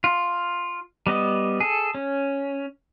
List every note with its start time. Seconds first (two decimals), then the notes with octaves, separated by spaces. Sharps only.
0.04 F4
1.07 G3 B3 D#5
1.60 G#4 A4
1.95 C#4